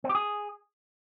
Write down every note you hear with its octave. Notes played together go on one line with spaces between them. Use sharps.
C4
G4
G#4